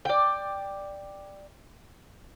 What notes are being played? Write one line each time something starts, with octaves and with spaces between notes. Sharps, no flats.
D5 G5